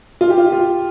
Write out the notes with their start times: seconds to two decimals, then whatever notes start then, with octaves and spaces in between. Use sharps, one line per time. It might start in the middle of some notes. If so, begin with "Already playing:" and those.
0.21 F4
0.30 G4
0.38 F4
0.52 F4